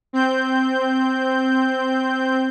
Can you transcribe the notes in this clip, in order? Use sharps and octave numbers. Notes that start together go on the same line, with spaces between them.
C4 G6